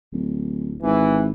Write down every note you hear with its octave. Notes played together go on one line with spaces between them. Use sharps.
D1
G#1 E3